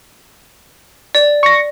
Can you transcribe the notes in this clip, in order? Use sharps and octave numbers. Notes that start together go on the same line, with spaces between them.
D5
C#6 A#6